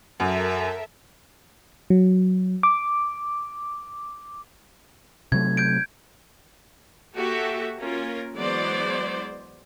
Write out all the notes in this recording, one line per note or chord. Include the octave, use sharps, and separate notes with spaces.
F#2 A4 A#4 E5
F#3
D6
C3 F#3 A3 G#6
G6 G#6 D7
A#3 F#4 G4 A4 E5
A#3 C#4 F4 A#4
E3 F#3 G#3 B3 C5 D5